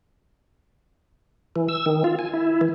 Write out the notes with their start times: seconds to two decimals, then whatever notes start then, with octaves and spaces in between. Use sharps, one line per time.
1.56 E3
1.69 E6
1.86 D#3
2.04 F4
2.19 G#5
2.33 E4
2.61 E3